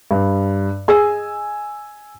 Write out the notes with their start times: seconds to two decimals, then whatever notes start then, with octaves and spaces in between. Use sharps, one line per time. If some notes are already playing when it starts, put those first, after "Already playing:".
0.11 G2
0.88 G#4 D#5 G#5 E6